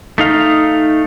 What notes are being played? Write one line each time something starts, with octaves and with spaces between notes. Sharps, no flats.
A3 D#4 F5